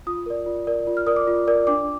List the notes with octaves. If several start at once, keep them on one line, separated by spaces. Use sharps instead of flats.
F4 D#6
A#4 D5
F4
A#4 D5
F4
F6
A#4 D5 D#6
D6
F4
A#4 D5
D4 D6